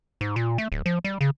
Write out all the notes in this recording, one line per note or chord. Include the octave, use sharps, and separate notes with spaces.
G#2
A#2
A3
D1
F3
G3
C#3